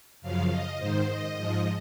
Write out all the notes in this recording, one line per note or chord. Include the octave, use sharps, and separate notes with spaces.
F#2 C#3 F3 F5
D#5
G#2 D#3 C5
D#5
G#2 F3